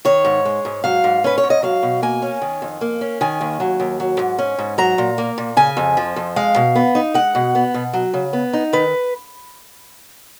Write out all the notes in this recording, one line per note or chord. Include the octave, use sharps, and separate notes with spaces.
D#3 C#5
G#2
G#3
G#2
F#3 F5
G#2
C#4 B4
C#5
G#2
D#5
F#3 F5
B2
A#3 G#5
C#4
D#3
F2
A#3
C#4
D#3 G#5
D#2
F#3
D#2
F#3
G#2
C#4
G#2
F#3 A#5
A#2
A#3
A#2
C#3 G#5
F2
F3
F2
G#3 F5
B2
B3
D#4
G#3 F#5
B2
B3
B2
F#3
C#3
B3
D#4
D#3 B4